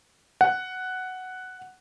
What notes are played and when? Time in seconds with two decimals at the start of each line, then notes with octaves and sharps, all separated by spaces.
0.41 F#5